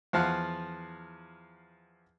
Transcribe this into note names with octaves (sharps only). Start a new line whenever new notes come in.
E2 F3 F5 F#5